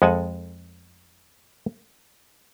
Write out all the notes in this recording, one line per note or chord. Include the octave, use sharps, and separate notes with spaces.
F2 G#3 A4 F#5 G#5 A5